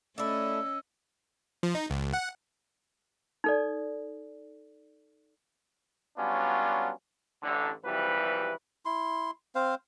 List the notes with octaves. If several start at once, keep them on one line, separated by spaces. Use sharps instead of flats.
A3 C#4 D4 E4 D#5 E6
F3
D#4
C#2
F#5
D#4 A4 D5
F#3 G3 B3 C#4 D4 F4
A1 D3
G#1 C3 E3 F3 G3 B4
E4 C6
C4 C5 F5